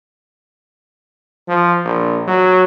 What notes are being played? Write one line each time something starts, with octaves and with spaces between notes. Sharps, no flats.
F3
A#1
F#3